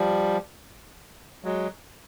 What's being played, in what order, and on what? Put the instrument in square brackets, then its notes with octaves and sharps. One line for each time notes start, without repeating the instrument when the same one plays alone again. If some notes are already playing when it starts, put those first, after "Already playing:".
Already playing: [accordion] F3 G3
F#3 G#3